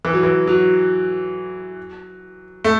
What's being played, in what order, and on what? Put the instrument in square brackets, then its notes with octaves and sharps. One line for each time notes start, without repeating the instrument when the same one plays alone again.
[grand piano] E3
F#3
E3
F#3
A3